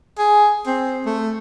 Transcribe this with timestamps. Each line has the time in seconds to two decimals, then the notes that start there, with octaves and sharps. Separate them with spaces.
0.18 G#4
0.67 C4
1.06 A3